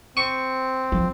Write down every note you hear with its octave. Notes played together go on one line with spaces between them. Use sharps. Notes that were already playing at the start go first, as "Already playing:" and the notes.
C4 C#6
F3